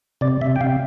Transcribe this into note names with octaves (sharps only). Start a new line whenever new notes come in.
C3 D5
C3 E5
G5
C3 F5